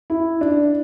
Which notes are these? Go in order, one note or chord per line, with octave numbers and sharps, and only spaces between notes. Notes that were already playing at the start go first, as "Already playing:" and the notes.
E4
D4